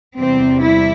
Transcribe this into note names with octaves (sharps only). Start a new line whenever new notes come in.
E2 C3 G3 C4
E4